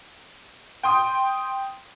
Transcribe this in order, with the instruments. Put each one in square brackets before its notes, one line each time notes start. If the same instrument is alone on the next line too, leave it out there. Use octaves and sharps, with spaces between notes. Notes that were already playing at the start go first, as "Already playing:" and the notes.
[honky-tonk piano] G5 C6 D#6